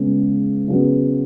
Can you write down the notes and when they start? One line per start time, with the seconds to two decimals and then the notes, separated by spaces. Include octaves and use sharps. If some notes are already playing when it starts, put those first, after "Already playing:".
Already playing: C#3 G#3 B3
0.68 C#3 F#3 B3